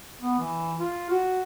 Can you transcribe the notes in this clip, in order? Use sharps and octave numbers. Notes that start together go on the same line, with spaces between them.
B3
E3
F4
F#4